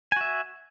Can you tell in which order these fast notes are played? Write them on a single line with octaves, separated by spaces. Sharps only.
G#5 F#4 E5